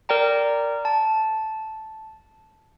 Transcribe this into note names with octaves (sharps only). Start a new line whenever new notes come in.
A#4 D5 G5 A#5
A5